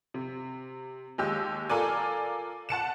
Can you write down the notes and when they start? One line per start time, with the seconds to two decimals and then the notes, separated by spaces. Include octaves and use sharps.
0.14 C3
1.18 D#2 G#3 G4 E6
1.70 F4 A4 A#4 D5 G#5
2.69 F#5 A5 C#7 E7